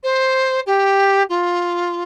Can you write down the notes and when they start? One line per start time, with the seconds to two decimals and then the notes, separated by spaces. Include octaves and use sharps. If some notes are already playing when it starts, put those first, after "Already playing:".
0.03 C5
0.66 G4
1.29 F4